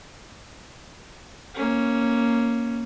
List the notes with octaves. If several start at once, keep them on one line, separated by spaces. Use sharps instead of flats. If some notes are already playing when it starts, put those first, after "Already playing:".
A#3 C#4